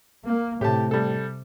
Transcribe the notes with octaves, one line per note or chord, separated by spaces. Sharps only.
A#3
A2 C3 G4 A5
G3 A4